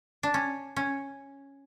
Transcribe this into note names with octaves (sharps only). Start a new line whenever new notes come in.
D4
C#4
C#4